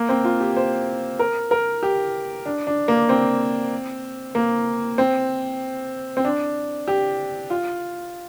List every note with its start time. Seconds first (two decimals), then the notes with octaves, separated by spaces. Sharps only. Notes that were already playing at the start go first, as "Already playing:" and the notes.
Already playing: A#3
0.09 C4
0.25 F4
0.40 G4
0.56 C5
1.19 A#4
1.51 A#4
1.83 G4
2.46 D4
2.67 D4
2.88 A#3
3.09 C4
4.35 A#3
4.98 C4
6.17 C4
6.25 D4
6.88 G4
7.50 F4